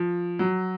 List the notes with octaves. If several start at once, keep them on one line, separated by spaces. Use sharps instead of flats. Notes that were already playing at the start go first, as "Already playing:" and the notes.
Already playing: F3
F#3